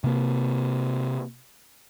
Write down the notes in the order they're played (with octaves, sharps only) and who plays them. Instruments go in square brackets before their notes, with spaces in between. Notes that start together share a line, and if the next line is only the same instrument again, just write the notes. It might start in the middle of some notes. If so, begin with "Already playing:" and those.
[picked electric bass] C3 A#3